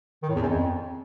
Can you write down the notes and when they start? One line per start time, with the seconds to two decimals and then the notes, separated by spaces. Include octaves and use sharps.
0.23 D#3
0.29 A2
0.35 E2
0.42 F#2
0.48 F2